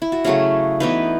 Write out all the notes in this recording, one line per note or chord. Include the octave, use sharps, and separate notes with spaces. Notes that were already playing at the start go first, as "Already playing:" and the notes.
E4
F#4
C#3 F#3 A3 C#4 G#4
E3 B3 D#4 B4